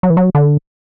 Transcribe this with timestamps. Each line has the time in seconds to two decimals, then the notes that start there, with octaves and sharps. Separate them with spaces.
0.03 F#3
0.10 E3
0.17 F#3
0.35 D3